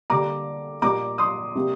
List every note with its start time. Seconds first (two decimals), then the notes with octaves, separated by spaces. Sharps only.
0.10 D3 G3 A#3 A#5 D6
0.82 A#2 G3 A#3 A#5 D6
1.18 C6 D#6
1.55 C3 G3 A#3